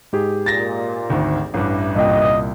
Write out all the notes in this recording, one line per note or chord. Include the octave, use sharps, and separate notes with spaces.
G#2 G4 G#4
A#2 A6 A#6
G#1 D2 D#3
A1 G2 E3
C2 A#2 D#5 G5